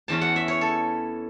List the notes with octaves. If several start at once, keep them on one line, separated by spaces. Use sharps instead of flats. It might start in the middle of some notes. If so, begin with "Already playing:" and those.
E2 E3 C#4 E4 A5
F#5
E5
C#5
A4